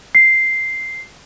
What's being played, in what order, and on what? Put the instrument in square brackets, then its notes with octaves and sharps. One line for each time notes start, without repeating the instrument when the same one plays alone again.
[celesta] C7